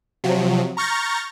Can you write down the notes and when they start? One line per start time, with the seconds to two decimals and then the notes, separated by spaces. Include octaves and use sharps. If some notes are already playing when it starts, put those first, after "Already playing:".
0.24 C3 F3 F#3
0.77 A#5 C#6 F6 G6 A6 A#6